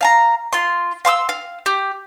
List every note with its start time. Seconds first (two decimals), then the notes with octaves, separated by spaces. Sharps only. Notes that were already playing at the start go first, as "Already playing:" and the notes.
0.01 F5 A5 A#5
0.53 F4 C6
1.05 F5 C6 D6 E6
1.29 F5
1.66 G4